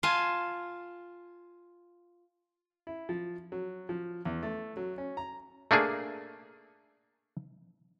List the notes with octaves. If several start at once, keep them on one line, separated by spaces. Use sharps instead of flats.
F4 G#5 A5
E4
F3
F#3
F3
E2
A3
F#3
C#4
A#5
A3 A#3 D4 G#4